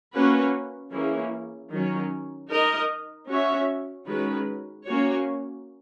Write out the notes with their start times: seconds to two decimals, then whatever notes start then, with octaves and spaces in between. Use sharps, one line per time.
0.13 A#3 C#4 F#4 B4
0.92 E3 A#3 C#4 E4 G#4
1.70 D#3 F#3 C#4
2.49 D#4 A#4 D#5
3.28 C#4 F#4 C#5 E5
4.06 D#3 G#3 C#4 F#4 B4
4.85 A#3 C#4 F#4 C#5